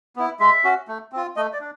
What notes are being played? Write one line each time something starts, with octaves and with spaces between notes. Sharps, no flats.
B3 E4
G#3 E5
C#4 F#4
A3
C4 F4
A3 D#5
D5
D4